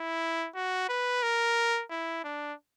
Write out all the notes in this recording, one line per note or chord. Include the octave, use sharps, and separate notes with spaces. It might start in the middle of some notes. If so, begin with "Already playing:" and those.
Already playing: E4
F#4
B4
A#4
E4
D4